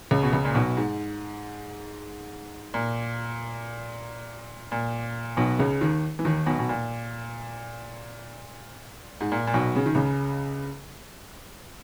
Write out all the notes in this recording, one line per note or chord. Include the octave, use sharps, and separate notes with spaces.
C#2 C#3
B2
C#2 C#3
A#2
B1 B2
G#2
A#2
A#2
B1 B2
C#2 C#3
D#2 D#3
E3
D#2 D#3
B1 B2
B2
A#2
G#2
A#2
A#2
B1 B2
C#3
D#3
C#2 C#3